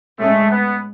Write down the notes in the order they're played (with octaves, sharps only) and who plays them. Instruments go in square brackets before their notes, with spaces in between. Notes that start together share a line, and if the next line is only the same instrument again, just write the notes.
[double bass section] A2 G#3 C#4 [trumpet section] A3
[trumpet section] B3